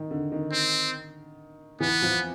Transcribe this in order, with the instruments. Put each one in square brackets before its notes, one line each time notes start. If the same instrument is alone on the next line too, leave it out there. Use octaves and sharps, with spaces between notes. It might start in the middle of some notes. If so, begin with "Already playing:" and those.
Already playing: [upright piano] D#3
D3
D#3
[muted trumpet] C4
[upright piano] E3 [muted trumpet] B3
[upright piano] F3